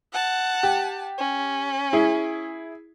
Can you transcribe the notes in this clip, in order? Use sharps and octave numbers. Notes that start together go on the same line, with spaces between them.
F#5 A5
G4
C#4
E4 G#4